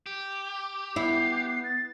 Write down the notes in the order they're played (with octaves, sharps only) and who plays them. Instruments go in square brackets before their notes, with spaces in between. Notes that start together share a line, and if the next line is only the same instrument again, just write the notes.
[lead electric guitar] G4
[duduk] B3 [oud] E4 [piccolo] C7
[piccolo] A6